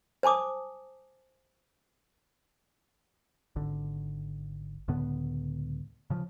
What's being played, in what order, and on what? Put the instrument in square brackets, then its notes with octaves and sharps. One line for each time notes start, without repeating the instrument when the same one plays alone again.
[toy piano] C5 G#5 A5 D6 D#6
[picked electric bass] G#1 D3
C#2 A2 D3 B3
C#3 F3